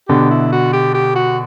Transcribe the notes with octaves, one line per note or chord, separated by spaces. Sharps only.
B2 D3 G4
E4
F#4
G4
G4
F#4